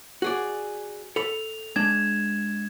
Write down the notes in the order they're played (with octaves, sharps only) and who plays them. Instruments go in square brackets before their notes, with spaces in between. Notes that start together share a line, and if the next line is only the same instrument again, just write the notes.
[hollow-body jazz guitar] F#4 G#4 D5
[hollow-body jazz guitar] A4 B5 [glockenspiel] F7
[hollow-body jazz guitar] G#3 D4 [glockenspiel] G#6 E7